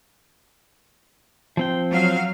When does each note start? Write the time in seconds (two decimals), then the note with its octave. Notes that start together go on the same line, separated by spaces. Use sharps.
1.57 F3 C4 G5
1.92 F#3 F5